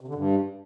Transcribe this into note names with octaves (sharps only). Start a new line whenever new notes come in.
C3
D3
G2